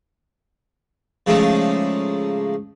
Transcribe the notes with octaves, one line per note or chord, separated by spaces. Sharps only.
C#3 F3 G#3 A3 D4 D#4